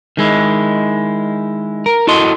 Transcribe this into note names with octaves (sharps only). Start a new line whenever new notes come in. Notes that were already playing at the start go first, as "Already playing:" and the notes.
D#3 G#3 E4
A#4
E4 F#4 A4 D#5 C6